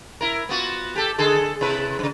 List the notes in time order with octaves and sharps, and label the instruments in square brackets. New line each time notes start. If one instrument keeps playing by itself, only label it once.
[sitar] E4 A#4
B3 F4 F#4
G4 A4
D3 G#4 A4
C3 E4 B4
G2 C#3